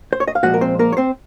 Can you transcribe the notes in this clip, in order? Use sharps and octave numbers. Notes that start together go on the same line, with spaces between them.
C5
C#5
D#5
F5
A#2 F3 G#3 F#4 F#5
A#4
C4 C5
A#3 A#4
C#5
C4 C5